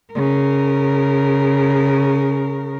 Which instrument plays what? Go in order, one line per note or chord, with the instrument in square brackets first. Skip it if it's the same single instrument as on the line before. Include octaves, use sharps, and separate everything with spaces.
[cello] C#3 A#4